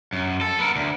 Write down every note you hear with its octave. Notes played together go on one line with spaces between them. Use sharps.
F#2
A4
B3 A#4
D2